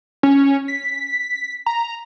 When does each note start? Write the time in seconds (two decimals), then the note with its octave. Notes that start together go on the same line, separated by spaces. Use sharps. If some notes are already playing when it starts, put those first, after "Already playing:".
0.23 C#4
0.68 B6
1.66 A#5